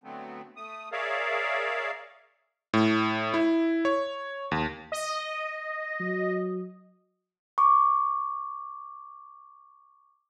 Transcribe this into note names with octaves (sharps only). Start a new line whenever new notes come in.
D3 F#3 A3 B3 C4
A3 D#6
G#4 A#4 C#5 D5 E5 F5
A2
E4
C#5
D#2
D#5
F#3
C#6 D6